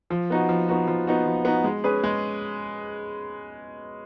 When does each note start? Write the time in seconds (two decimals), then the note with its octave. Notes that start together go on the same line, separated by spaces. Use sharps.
0.10 F3
0.30 B3 D#4 F#4
0.49 F3
0.69 B3 D#4 F#4
0.87 F3
1.07 B3 D#4 F#4
1.26 F3
1.45 B3 D#4 F#4
1.64 G#3
1.84 C#4 G#4 B4
2.04 G#3